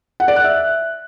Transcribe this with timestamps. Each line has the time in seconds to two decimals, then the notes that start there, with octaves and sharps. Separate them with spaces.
0.20 F#5
0.28 D5
0.36 F#6
0.44 E5